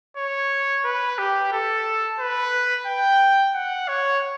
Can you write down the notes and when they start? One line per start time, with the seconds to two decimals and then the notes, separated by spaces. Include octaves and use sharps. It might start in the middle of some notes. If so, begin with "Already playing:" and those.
0.17 C#5
0.85 B4
1.18 G4
1.53 A4
2.19 B4
2.87 G5
3.55 F#5
3.88 C#5